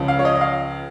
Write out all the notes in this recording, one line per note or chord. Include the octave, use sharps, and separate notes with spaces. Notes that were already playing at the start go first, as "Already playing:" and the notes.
Already playing: C#2 C#3 F3
F5
C#5
D#5
D#5
F5